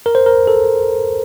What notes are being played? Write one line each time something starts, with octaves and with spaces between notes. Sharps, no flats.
A#4
C5
A#4
A4